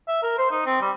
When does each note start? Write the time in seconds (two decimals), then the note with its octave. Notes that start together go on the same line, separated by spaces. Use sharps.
0.08 E5
0.23 A#4
0.38 C5
0.51 D#4
0.66 C4
0.81 G3